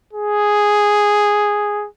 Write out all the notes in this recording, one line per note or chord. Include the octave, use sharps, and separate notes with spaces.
G#4